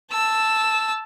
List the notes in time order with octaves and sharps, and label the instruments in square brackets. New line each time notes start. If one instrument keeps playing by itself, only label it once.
[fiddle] A5 E6